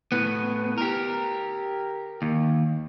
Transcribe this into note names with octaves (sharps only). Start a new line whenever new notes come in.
A2 B3
G4 A#4
D#2